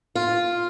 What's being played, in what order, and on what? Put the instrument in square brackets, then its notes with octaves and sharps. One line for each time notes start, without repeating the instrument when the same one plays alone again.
[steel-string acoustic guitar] F4